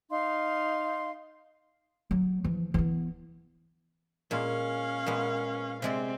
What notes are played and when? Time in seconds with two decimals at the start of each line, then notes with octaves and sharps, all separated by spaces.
0.09 D#4 F5 C6
2.11 F#3
2.45 E3 F3
2.74 E3 B3
4.31 A#2 G#3 C#4 F5
5.06 A#2 G#3 B3
5.82 C3 G#3 C4 D5